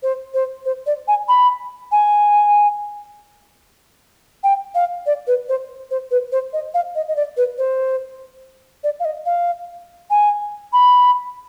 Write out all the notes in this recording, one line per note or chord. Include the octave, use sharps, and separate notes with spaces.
C5
C5
C5
D5
G#5
B5
G#5
G5
F5
D5
B4
C5
C5
B4
C5
D#5
F5
D#5
D#5
D5
B4
C5
D5
F5
D#5
F5
G#5
B5